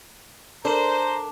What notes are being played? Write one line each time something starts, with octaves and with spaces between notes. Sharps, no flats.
D4 A4 A#4 C5 A#5